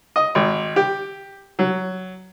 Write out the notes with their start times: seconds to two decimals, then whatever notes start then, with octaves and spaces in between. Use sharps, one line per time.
0.16 D#5
0.35 G#1
0.76 G4
1.59 F#3